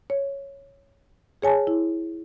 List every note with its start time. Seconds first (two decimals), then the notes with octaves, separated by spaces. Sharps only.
0.10 C#5
1.42 G#4 C#5 G#5 A5
1.67 E4